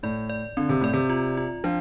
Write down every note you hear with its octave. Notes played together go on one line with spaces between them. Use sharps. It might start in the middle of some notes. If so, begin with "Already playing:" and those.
A2 D5
D5
D3 C4
C3
A2 D5
C3
F4
F4
F3 D4